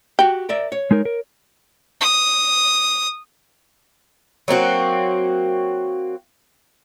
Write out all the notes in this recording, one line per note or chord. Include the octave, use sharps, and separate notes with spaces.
F#4 G4 G5
A#4 D5 E5
C#5
G#3 D#4 A#4
A#4
D#6
F#3 A#3 C4 F#4